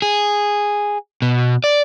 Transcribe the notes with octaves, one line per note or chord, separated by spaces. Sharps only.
G#4
B2
D5